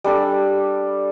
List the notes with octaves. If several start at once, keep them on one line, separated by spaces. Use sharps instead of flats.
G3 D4 A4